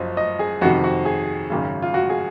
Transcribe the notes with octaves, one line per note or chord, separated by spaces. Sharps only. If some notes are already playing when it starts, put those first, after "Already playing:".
Already playing: F#1 F#2 F3 D#5
D#5
G#4
F2 C3 D#3 F#4
F#4
G#4
G#1 F#2 C#3
F4
F#4
G#4